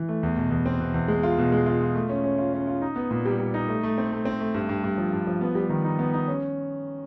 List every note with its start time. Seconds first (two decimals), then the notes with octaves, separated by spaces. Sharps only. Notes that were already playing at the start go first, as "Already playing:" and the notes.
Already playing: E3
0.09 A3
0.23 E2
0.37 B2
0.51 E2
0.66 C4
0.80 B2
0.94 E2
1.08 G#3
1.23 F4
1.38 B2
1.52 G#3
1.66 F4
1.81 F4
1.95 A3
2.09 C#4
2.24 C#4
2.38 F4
2.54 C#4
2.67 F4
2.82 D#4
2.96 B3
3.11 A#2
3.26 G3
3.40 G3
3.54 D#4
3.68 A3
3.83 A3
3.98 C4
4.12 A3
4.25 C4
4.40 A3
4.54 G2
4.69 G2
4.84 G2
4.98 F3
5.13 G2
5.27 F3
5.41 B3
5.55 G3
5.70 D#3
5.84 D#4
5.99 B3
6.14 D#4
6.27 C#4